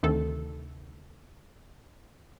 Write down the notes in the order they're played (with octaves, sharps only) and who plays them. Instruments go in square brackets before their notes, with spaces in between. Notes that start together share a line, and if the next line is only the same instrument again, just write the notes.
[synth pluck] D2 C3 D#3 A4